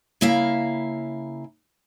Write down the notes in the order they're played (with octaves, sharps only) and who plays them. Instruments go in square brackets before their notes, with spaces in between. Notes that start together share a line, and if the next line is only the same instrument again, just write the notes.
[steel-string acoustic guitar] C#3 A#3 E4 E5 F5 A#5